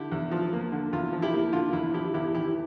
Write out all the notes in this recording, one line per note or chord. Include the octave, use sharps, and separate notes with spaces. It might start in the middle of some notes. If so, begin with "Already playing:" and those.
Already playing: D3 E4 G4
E2
F3
A#3
D3
E2 F4
F3
E4 G4
A#3
D3 F4
E2 E4
F3 E4 G4
E2 E4 G4
E3 E4 G4